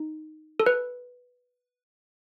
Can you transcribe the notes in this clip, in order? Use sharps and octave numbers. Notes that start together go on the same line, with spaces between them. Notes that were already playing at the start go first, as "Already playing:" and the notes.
Already playing: D#4
A4
B4